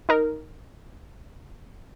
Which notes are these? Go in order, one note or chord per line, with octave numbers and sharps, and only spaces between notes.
D#4 A#4